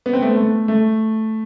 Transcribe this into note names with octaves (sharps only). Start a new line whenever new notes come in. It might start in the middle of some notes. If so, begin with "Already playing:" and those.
B3
C4
A3 B3
A3
A3